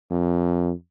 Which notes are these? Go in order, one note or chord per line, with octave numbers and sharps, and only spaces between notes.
F2